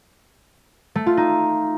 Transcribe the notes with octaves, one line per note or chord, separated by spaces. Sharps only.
A3
F4
D#4